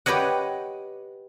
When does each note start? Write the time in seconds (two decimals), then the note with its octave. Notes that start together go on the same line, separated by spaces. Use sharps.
0.06 G4 B4 C#5 D#5 F#5